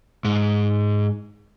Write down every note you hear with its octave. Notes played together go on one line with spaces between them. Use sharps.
G#2